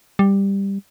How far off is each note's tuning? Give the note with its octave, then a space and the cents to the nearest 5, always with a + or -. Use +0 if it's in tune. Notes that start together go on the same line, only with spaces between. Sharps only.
G3 +10